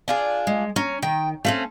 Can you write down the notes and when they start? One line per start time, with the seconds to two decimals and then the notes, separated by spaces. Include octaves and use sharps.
0.08 D4 F4 G#4
0.47 G#3
0.76 C#4 A#5
1.02 D#3 G5
1.45 A3 C4 C#4 A4 F5